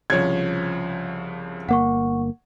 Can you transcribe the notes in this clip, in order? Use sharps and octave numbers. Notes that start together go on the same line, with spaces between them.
C2 C#3 F3 C#5 G#6
G1 A#3 F#5 C#6